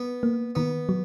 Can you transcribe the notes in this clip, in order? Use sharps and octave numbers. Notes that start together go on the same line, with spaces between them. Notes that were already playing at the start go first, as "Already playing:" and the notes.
Already playing: B3
A#3
D#3 B3
F#3